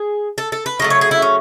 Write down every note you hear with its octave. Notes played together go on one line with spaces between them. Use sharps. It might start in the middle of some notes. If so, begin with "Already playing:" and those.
Already playing: G#4
A4
A4
B4
C#3 F#3 A3 D#5
C#5
G#4
E4
C#4